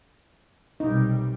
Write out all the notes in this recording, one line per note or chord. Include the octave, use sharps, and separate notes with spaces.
B1 C3 G3 D#4